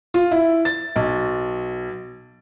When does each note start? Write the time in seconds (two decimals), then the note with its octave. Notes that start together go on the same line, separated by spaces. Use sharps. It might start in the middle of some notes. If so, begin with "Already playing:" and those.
0.14 F4
0.31 E4
0.65 A6
0.96 B1